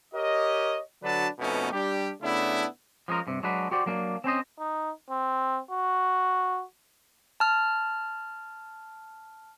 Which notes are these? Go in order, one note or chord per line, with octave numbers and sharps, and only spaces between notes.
G4 A#4 C#5 D#5
D3 F#3 D4 F#4 B4 A5
F2 B2 A3 B3 C#4 D#4
G3 D4 G4
C#3 A3 B3 D4 E4
F3 G#3 C#4 A#4
G2 C3
F#3 G#3 D4 F#4 B4
F#4 G4 C5 D5
F#3 A#3 D4
C4 C#4 C5 D#5
D#4
C4
F#4
A5 F6